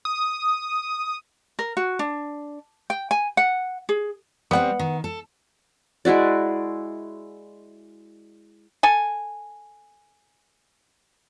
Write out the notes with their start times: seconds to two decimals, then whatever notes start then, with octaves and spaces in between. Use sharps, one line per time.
0.05 D#6
1.59 A#4
1.77 F#4
1.99 D4
2.90 G5
3.11 G#5
3.37 F#5
3.89 G#4
4.51 G3 B3 C4 F#5
4.79 D#3
5.04 A4
6.05 G#3 E4 F#4 D5
8.83 A4 G#5